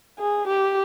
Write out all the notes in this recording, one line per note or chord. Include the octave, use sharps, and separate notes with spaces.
G#4
G4